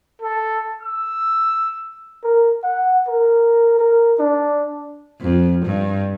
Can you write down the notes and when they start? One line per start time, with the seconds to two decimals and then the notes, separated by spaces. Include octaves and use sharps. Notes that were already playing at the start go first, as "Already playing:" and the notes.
0.22 A4
0.82 E6
2.23 A#4
2.63 F#5
3.07 A#4
3.79 A#4
4.19 D4
5.21 F2
5.65 G2